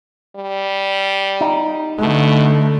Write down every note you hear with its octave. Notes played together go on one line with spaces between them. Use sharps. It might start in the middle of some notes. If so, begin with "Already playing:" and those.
G3
D#4
B2 D3 A3